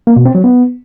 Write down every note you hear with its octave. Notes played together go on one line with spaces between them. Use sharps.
A#3
B2
C4
F#3
B3